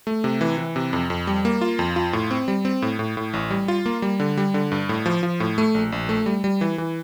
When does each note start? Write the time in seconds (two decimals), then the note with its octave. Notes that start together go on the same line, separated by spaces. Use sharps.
0.07 A3
0.24 C3
0.41 E3
0.58 E3
0.76 C3
0.93 F2
1.10 F2
1.27 G3
1.45 A#3
1.61 F4
1.79 F2
1.96 F4
2.13 A2
2.31 C4
2.48 G3
2.65 C4
2.82 A2
2.99 A2
3.17 A2
3.33 A1
3.51 G3
3.68 F4
3.86 A#3
4.02 G3
4.20 D3
4.37 G3
4.54 D3
4.72 G2
4.89 A2
5.06 F3
5.23 F3
5.40 A2
5.58 A3
5.75 A#1
5.92 A#1
6.09 A3
6.26 G3
6.44 G3
6.61 E3
6.78 E3